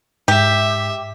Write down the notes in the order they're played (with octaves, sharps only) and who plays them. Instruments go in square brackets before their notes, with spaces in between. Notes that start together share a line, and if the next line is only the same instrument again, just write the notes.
[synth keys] G#2 [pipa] G4 [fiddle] E5